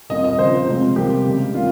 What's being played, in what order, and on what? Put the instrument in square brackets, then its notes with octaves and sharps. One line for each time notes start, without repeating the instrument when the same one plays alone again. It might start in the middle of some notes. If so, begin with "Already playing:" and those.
[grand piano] A#2 G3 C4 D#5
D#5
C#3 F3 C4 C5
C3 F3 G#3 C4
C3 G3 A#3 G4
C#3 G#3 C4
C3 G3 A#3 F4